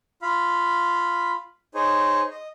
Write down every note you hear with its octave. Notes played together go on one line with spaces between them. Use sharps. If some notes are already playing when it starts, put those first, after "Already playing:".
F4 F5 B5
D#4 G#4 C5 C#5
D#5